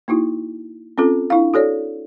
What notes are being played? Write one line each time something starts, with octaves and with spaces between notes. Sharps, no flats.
A#3 D#4 E4 F#4
C4 C#4 F4 A4
D4 E4 F5
F#4 A4 C#5 D5